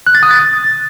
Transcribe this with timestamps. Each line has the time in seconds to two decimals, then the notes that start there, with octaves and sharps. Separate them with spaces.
0.07 F#6
0.15 A6
0.23 D#6
0.31 A6